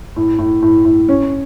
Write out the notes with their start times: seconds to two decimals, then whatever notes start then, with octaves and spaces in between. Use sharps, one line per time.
0.16 A2
0.39 A2
0.62 A2
0.85 A2
1.09 C#4